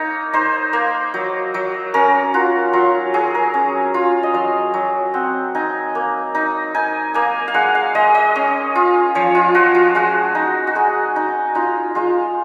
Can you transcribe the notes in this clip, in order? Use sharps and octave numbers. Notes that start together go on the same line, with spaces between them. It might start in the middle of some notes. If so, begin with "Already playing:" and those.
Already playing: A#3 D#4 C#5
D#4 C5
A#3
F#3
F#3
C#4 A#4
F4 F#4
F#3 F4
F#3 G#4
A#4
C#4
F4
D#5
F#3 F5
F#3
C4 F#5
D#4 G#5
A#3
D#4
D#4 G#5
A#3 G#5
F5
G#3 F#5
F5
G#3 D#5
D#5
C#4
F4
F3 C#5
F4
F3 F#4
F4
G#3 F#4
D#4
F#4
G#3 G#4
D#4
D#4 F4
G#3 F4